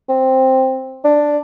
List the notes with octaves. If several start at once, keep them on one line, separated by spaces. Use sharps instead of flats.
C4
D4